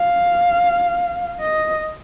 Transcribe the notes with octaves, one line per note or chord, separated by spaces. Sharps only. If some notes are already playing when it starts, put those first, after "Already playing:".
Already playing: F5
D#5